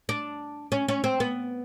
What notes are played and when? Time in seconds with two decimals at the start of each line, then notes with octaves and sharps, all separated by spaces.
0.09 D4
0.72 C#4
0.88 C#4
1.04 C4
1.20 B3